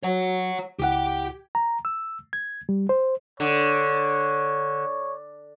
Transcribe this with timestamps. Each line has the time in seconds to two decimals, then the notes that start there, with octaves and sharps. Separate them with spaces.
0.03 F#3 C#5 F#5
0.79 C#2 E4 G4 F#5 G5
1.55 A#5
1.85 E6
2.33 G#6
2.69 G3
2.89 C5
3.40 D3 C#5